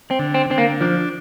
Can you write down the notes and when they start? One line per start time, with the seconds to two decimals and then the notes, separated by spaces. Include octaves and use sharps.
0.11 C4
0.19 D3
0.34 C4
0.50 D3 C4
0.58 A#3
0.81 F3 D4